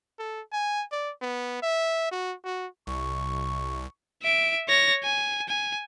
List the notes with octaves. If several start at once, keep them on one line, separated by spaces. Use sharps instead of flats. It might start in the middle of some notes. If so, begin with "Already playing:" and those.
A4
G#5
D5
B3
E5
F#4
F#4
C2 C#6
E5 D7
C#5 A#6
G#5
G#5